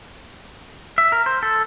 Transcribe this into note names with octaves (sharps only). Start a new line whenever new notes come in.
E5
A#4
C5
A4